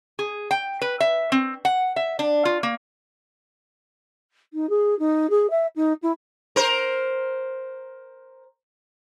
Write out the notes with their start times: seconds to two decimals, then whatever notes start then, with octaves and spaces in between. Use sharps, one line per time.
0.19 G#4
0.51 G5
0.81 B4
1.00 E5
1.32 C4
1.65 F#5
1.96 E5
2.19 D4
2.45 F4
2.63 A#3
4.53 D#4
4.69 G#4
4.99 D#4
5.30 G#4
5.50 E5
5.76 D#4
6.02 E4
6.56 A#4 C5